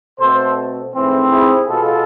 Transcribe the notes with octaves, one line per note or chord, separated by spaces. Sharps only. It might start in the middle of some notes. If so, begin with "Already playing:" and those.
B2 A3 C4 A4 C5
G#2 E3 A3 C4
E4 G#4
B2 G#3 B3 F4 A4